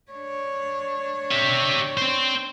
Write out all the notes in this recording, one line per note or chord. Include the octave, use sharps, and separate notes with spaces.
D4 C#5
G4 E5
C4 C5